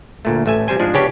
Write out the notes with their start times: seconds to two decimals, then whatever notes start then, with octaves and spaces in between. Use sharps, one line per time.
0.25 D2 A#2 A3
0.46 A1 A3 E5 G#5
0.68 C3 G3 C5 G#5
0.79 G#2 F3 G#3 D4 G#4
0.94 C#3 B3 C#4 D4 F#4 G4